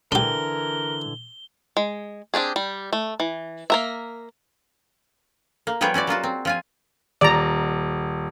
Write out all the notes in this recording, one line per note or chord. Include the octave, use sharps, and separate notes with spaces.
D3 E3 D4 G4 A#4 G7
G#3
C4 D4 G4 G#4
G3
A3
E3
A#3 A#4 E5
A#3
F3 G3 B3 G#4 C#5 G5
C#4 E4 F#4 D5
F#3 A#3 F4 F#4
C4
F3 F4 G#5
D#1 D5 A#5